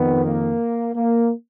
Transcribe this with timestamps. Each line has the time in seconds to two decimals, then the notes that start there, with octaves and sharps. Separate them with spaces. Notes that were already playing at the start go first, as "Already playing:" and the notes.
Already playing: F2 D#3 B3
0.25 A#3
0.95 A#3